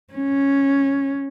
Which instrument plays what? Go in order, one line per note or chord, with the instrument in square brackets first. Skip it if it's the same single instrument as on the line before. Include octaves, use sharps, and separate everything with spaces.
[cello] C#4